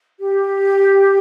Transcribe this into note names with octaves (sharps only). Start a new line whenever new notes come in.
G4